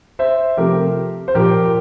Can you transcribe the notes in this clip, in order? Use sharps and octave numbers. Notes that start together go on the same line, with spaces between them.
C5 E5
C3 F3 A3 G4 A#4
C5
A#2 F3 A#3 G4 A#4